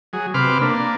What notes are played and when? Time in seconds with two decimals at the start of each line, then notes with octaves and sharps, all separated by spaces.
0.13 F#3 G#4
0.34 C3 B4 C6 D6 F6
0.62 A#3 D4